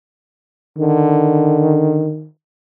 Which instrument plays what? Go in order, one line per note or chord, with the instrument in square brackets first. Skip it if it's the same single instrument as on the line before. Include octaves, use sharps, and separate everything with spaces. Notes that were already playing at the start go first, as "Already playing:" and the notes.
[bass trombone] D3 [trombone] D#3